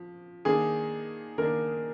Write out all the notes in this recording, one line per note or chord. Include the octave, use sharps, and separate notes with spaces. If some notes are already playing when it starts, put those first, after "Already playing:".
Already playing: F3
D#3 A#3 D4 G#4
D#3 A#3 D4 A#4